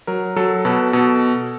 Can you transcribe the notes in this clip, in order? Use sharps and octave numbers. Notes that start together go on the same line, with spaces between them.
F#3 A#4
F#3 A4
B2 A4 B4
B2 A4